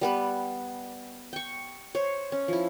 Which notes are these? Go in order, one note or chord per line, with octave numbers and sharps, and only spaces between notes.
G3 B3 B4
G5 C#6
C5 C#5
C#4
F3 E4